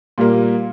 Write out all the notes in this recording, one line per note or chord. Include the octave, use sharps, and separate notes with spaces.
A#2 G3 A#3